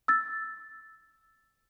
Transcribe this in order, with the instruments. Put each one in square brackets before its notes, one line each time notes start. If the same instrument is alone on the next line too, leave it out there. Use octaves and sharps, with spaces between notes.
[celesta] E6 A6